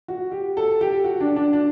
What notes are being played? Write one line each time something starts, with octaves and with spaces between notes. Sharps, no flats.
F#4
G4
A4
G4
F#4
D4
D4
D4